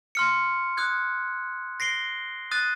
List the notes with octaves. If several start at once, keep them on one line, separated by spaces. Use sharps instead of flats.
C6 F6 C#7
D#6 F#6 G#6
A#6 C7 D7 G7
D#6 F#6 A6 D#7